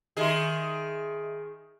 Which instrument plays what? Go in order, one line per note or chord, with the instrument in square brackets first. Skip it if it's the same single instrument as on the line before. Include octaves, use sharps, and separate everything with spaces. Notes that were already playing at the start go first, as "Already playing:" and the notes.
[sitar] D#3 G#4 [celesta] D#5 E5 C6